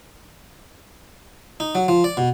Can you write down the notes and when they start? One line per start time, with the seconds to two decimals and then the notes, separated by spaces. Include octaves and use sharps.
1.60 D#4
1.75 F#3
1.88 F3
2.04 D5
2.17 B2